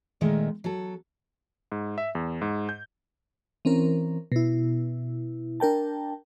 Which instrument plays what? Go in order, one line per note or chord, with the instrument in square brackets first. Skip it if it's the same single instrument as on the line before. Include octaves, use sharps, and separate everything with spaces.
[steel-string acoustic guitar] A#2 D#3 G#3 A3
F#3 A4
[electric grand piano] G#2
E5
E2
G#2
G6
[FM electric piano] E3 C4 C#4 A#4
B2 E4
D4 A#4 G5 A5